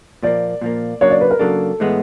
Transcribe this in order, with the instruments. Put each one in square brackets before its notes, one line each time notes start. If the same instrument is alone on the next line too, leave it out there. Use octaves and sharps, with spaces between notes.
[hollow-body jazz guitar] A#2 F3 A#3 [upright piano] D5
[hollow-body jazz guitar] A#2 F3 A#3
[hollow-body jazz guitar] C#3 F#3 A#3 D4 [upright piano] C#5
[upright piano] D5
B4
A#4
[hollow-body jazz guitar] C#3 F#3 A#3 D4 [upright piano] A4
[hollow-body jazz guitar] A2 E3 G#3 B3